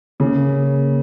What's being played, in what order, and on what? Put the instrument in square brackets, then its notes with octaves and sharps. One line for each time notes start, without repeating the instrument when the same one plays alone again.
[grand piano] C#3 [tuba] A#3